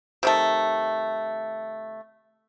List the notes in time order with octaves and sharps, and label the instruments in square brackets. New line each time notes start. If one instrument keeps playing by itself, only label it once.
[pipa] C3 D#3 A3